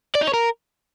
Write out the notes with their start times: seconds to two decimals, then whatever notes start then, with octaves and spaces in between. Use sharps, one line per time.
0.15 D5
0.21 D#4
0.27 C#5
0.34 A#4